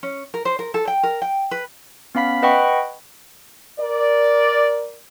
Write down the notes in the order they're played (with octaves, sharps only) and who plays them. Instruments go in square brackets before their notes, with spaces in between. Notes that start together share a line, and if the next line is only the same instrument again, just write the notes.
[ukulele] C#4
A#4
C5
A#4
A4
G5
A#4
G5
B4
[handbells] B3 C#4 F5 B5 B6
B4 D#5 F#5 G5 B5 C#6
[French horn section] A#4 D5